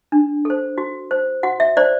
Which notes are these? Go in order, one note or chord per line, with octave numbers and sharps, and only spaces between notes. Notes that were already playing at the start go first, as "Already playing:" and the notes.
D4
A4 C5
F#4
C5
F#4 F#5
E5
C5 D5